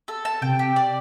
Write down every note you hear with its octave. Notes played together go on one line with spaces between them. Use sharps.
A4
A5
C3 G5
G4
D5